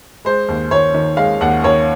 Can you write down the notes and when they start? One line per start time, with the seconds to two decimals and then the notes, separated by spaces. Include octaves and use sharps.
0.25 G#3 C5
0.48 D#2
0.71 D#2 C#5
0.94 D#3
1.17 G#3 F5
1.41 D#2 F#5
1.64 D#2 C#5